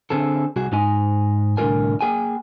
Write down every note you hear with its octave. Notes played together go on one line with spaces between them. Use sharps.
D3 C4 G#4 A4
C2 F#4 G#4
G#2 D#4 G#5
C2 A2 D3 F4 A#4 G#5
A#3 G#4 G5 G#5